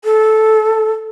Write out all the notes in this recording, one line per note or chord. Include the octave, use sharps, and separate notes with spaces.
A4